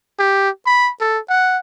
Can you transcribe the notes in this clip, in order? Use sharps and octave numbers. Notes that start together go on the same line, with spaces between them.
G4
B5
A4
F#5